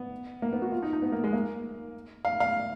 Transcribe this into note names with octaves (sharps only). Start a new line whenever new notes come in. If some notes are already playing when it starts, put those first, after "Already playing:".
Already playing: B3
A#3
B3
F#4
F4
D#4
D#4
B3
A#3
G#3
A#3
F5
F5